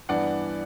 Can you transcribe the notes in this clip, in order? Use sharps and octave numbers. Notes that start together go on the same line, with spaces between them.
G2 E3 B3 D4 D5 F#5